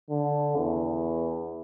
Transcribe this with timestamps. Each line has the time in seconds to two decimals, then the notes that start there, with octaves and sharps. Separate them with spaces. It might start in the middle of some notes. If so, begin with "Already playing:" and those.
0.10 D3
0.56 E2